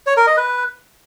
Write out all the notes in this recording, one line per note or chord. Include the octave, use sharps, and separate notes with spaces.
C#5
A#4
D#5
B4